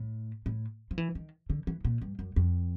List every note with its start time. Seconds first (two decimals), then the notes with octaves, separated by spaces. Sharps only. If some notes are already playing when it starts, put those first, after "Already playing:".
Already playing: A2
0.46 A2
0.91 F3
0.98 E3
1.15 D#3
1.50 D3
1.67 E3
1.85 A#2
2.02 G2
2.19 F#2
2.36 F2